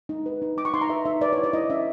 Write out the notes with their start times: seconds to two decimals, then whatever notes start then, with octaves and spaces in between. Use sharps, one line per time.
0.09 D#4
0.26 B4
0.42 D#4
0.57 D#4 D6
0.65 C#6
0.74 D#4 C6
0.81 A#5
0.90 B4 E5
1.05 D#4 E5
1.21 B4 D5
1.33 C#5
1.38 E4
1.44 D5
1.53 E4 D#5
1.70 C#4 E5